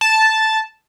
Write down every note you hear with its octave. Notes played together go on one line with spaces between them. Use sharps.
A5